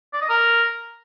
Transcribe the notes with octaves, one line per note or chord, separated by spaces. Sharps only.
D5
D#5
A#4